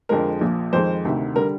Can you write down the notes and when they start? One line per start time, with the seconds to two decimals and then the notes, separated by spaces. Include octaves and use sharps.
0.09 F2 D3 F3 G#3 A#4
0.41 A#1 A#2 F3
0.73 F2 D#3 G#3 C5
1.04 D2 C3 D#3
1.36 D3 G3 A#4